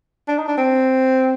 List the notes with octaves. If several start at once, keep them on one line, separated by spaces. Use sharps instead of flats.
D4
D#4
D4
C4